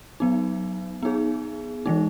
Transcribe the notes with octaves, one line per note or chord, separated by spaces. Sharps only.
F#3 B3 D#4
B3 D#4 G#4
E3 G#3 D#4